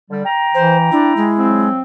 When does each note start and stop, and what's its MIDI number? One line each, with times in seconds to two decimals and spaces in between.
0.10 0.22 50
0.10 0.22 55
0.25 1.26 79
0.25 1.26 82
0.55 0.87 52
0.55 0.77 72
0.92 1.13 62
0.92 1.72 64
1.17 1.69 56
1.38 1.82 53
1.38 1.82 54
1.38 1.82 60